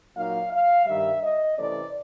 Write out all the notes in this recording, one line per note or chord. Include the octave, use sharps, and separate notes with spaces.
A#2 F#3 A#3 D#4 F5
F5
G2 D#3 G3 E5
D#5
C3 E3 A3 C#4 D5